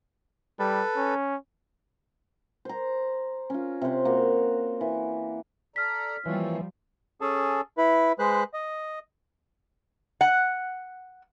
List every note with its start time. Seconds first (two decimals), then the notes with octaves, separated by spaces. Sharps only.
0.59 G3 A4 B4
0.97 C#4
2.65 C5 A#5
3.50 C#4 F4
3.82 C3 C5
4.05 A#3 F#4
4.81 E3
5.76 A4 D5 A#5 F6 B6
6.26 E3 F3 G3 A#3 C4 C#5
7.21 C#4 G#4 A4 A5
7.78 E4 B4
8.19 G#3 B4 C5 F#6
8.53 D#5
10.21 F#5